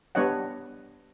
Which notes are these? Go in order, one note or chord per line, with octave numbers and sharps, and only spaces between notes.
G3 B3 D4 C#5 D#5 F#5